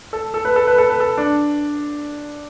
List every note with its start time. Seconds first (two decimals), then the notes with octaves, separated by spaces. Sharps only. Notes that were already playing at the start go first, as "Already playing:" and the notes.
0.13 A4
0.34 A4
0.45 B4
0.56 A4
0.67 B4
0.78 A4
0.89 B4
1.00 A4
1.17 D4